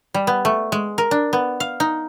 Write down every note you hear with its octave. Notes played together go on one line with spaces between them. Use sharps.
G3
B3
A3
G#3
A#4
D4
B3
F5
D#4